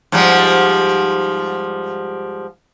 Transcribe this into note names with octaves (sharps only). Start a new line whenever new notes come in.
G#2 F3 G3